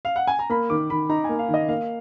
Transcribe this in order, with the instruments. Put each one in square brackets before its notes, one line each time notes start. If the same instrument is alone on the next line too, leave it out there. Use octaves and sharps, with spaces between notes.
[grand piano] F5
F#5
G#5
A#5
[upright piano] A#3 [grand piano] B5
[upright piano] D#3 [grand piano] D6
[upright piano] D#3 [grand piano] B5
[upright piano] D#4 [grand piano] A#5
[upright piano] A#3 [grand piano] G#5
[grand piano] F5
[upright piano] D#3
[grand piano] D#5
[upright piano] A#3 [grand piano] F5